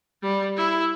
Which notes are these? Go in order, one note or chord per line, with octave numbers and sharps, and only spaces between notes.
G3
E4